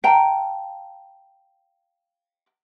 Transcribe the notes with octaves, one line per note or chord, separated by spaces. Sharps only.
F5 G5 A5 A#5